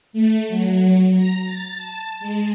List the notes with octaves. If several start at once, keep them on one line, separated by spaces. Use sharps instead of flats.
A3
F#3
A#5
A6
A5
G#3